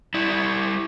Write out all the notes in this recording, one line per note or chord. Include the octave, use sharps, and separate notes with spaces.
G3 E4 D5